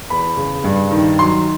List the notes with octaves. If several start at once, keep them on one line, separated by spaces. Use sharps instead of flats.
E2 B5
C#3
G2
D#3
F#3 C6